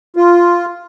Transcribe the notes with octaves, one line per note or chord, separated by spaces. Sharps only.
F4